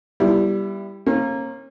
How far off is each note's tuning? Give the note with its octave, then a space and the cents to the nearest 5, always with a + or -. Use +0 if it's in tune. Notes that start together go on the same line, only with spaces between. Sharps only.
G3 +0 B3 -30 E4 +20
A#3 -5 C#4 -40